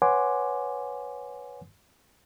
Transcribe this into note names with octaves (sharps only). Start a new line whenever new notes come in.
B4 C#5 F#5 G#5 C6 D6